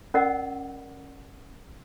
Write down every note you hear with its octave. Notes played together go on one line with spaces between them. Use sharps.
C#4 A#4 D5 D#5 F#5 E6